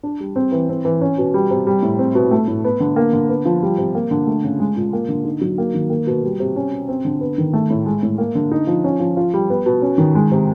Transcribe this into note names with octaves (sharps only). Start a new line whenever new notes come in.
D4
G3
C4
E3
C4
E3
C#4
B2
G3
C3
G3
A2
C4
B2
A3
A2
B3
D3
A#3
D3
B3
F3
G3
C3
A#3
D3
A3
C#3
G#3
A#2
A#3
D3
D#4
F#3
A#3
D#3
A#3
B2
G3
C3
C#4
B2
C4
D3
B3
D#3
A3
A2
G#3
A2
A#3
D3
D#4
F3
C#4
F3
F4
G3
B3
B2
C#4
D#3
G#3
C3